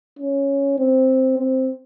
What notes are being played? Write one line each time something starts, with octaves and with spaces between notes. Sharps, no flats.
C#4
C4
C4